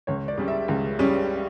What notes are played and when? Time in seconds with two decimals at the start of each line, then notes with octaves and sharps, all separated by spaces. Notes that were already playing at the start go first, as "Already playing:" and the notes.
0.07 C#2 C#5
0.28 D5
0.38 C#3 G3 C#4
0.48 E5
0.68 C#2
0.99 C#3 G3 C#4